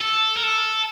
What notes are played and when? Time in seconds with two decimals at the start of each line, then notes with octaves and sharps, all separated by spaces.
0.01 A4
0.36 A#4
0.43 A4